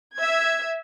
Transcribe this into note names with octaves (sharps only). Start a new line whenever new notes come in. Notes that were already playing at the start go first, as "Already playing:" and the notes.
E5 G#6